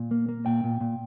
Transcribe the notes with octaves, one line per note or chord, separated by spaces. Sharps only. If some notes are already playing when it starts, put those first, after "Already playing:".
Already playing: A#2
A#3
A#3
A#2 G5
A#2
A#2